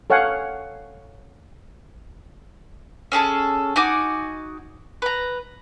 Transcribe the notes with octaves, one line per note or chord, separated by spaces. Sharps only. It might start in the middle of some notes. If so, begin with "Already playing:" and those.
A4 C#5 F5 F#5 G#5
C#4 G#4 A4 A5
D#4 F#4 G#5 D6
B4 A#5